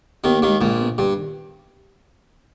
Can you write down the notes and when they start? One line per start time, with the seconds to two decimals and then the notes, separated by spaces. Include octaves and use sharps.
0.24 D#2 D#3 B3
0.36 A#3
0.42 D#2 D#3
0.48 G#3
0.61 A#1 A#2 G#3
0.80 B3
0.98 G2 B3
1.17 D#3